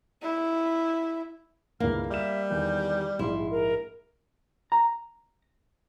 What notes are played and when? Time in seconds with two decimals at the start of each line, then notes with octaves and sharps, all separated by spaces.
0.22 E4
1.80 C#2 G2 E3 A#3 F6
2.11 G3 E5 F6 E7
2.50 E2 D#3 G6
3.19 A#1 G#2 E4 C6
3.50 A#4
4.72 A#5